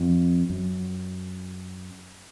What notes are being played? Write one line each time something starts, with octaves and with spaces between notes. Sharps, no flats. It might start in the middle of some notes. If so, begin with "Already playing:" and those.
Already playing: F2
F#2